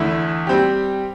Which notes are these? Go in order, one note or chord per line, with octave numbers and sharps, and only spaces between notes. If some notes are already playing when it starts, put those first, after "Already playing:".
Already playing: E2 D3 A3 E4
G3 C4 G4